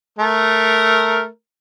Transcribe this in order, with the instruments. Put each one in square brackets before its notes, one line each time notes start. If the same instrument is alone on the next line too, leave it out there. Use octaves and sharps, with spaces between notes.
[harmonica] A3 A#4